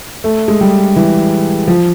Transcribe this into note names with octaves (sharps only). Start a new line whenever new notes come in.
A3
G#3
G3
E3
F3